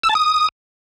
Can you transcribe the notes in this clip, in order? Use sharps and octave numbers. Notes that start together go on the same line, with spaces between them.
E6
A5
D#6